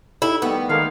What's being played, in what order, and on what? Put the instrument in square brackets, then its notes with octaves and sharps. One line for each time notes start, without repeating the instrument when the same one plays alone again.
[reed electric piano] D#4 G4 A4 [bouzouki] E4
[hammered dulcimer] D#3 G3 A3 [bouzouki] B3
[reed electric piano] D#3 A4 A#4 [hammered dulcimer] G#3 A#3 D#4 [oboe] F5